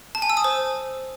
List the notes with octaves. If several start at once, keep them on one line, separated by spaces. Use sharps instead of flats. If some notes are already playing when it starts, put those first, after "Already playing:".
A5
G#5
E6
D#6
C5